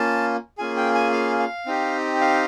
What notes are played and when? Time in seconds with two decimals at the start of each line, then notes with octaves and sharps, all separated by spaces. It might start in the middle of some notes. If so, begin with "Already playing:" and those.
Already playing: A#3 C#4 F4 A5
0.58 A#3 C#4 F4 G#4 G#5
0.77 G5
0.95 G#5
1.13 F5
1.40 F5
1.66 C4 D#4 G4
2.21 F5